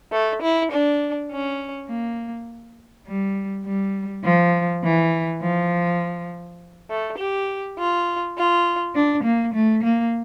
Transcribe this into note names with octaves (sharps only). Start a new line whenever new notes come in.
A3
E4
D4
C#4
A#3
G3
G3
F3
E3
F3
A3
G4
F4
F4
D4
A#3
A3
A#3